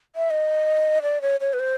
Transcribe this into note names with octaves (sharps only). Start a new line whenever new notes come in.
E5
D#5
D5
C#5
C#5
B4
C5